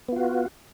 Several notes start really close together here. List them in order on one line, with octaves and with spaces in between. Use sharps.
B3 F4 F#4